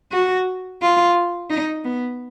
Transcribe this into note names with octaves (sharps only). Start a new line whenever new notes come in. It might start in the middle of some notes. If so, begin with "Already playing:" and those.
F#4
F4
D#4
B3